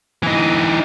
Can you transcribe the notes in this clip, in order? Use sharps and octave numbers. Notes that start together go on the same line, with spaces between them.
E3 D#4